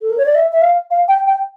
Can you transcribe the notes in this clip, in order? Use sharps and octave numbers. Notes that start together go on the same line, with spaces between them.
A4
A#4
C#5
D5
E5
E5
F5
F5
G5
G5